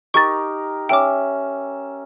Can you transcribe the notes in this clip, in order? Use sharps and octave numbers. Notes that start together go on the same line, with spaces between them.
D#4 G4 A#4 C#6 A6
C#4 E5 G5 D6